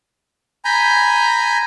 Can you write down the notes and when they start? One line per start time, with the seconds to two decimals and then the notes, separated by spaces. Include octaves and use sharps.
0.65 G#5 A#5 B5 G6